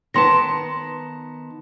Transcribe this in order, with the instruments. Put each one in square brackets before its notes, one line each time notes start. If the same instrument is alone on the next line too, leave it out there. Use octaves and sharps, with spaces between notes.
[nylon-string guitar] D#3 B3 A5 [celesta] C6 A#6